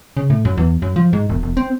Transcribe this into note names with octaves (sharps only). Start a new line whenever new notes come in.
C#3
A2
F#2
E2
F#2
F3
G#2
E1
E1
C4